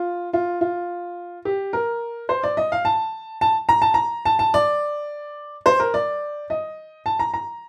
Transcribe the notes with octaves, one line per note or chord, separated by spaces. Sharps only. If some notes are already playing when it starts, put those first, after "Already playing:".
Already playing: F4
F4
F4
G4
A#4
C5
D5
D#5
F5
A5
A5
A#5
A5
A#5
A5
A5
D5
C5
A#4
D5
D#5
A5
A#5
A#5